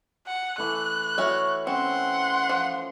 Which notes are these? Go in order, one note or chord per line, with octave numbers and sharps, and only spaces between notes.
F#5
E3 A3 F#6
C#4 E4 F#4
C4 C#4 F#5 C6
F3